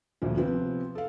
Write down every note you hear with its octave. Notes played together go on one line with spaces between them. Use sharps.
D2 A#2 F3
C3 F3 B3 C4
A4 F5